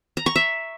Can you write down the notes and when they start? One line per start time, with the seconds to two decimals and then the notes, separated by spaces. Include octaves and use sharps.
0.17 A#5
0.26 C#6
0.36 E5